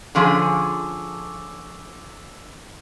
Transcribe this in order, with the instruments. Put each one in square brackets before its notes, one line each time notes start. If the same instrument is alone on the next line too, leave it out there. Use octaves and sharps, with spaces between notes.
[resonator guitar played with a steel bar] D3 F3 C#4 G#4